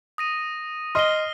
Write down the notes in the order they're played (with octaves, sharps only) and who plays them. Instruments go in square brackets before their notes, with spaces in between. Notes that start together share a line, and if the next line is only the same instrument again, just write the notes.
[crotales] D#6 A#6 D#7
[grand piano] D#5 C6 [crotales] F6 C7 G7